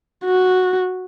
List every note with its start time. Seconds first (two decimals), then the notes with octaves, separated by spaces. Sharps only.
0.24 F#4